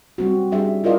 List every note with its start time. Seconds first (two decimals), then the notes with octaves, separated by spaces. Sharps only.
0.18 G3 C4 F#4
0.52 G3 C#4 D4 G4 G#4 E5
0.84 E4 F4 A#4 D5 D#5 F5